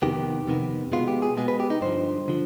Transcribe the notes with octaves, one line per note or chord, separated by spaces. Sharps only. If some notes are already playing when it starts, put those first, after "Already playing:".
F2 C3 D#3 B3 G4
F2 C3 D#3 B3
B2 G#3 B3 F4
G4
G#4
B2 G#3 B3 G#4
B4
G4
D#4
G2 D3 F3 C5
D3 F3